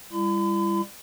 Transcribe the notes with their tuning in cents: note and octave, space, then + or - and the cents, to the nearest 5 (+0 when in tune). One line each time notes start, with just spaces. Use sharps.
G3 +25 E4 +35 B5 +45